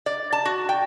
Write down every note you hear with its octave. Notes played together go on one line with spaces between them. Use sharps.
D5
A5
F#4
G5